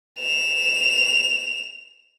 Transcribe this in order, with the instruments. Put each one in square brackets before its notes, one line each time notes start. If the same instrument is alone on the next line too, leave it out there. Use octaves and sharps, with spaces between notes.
[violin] E7 F7